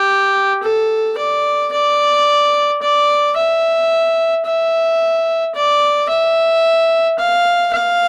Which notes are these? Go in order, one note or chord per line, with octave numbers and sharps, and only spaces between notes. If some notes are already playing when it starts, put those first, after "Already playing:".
Already playing: G4
A4
D5
D5
D5
E5
E5
D5
E5
F5
F5